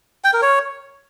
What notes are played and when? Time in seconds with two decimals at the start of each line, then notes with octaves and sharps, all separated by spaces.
0.24 G5
0.33 A#4
0.42 C#5